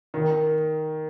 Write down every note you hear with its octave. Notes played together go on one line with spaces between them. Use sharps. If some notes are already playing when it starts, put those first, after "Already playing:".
D#3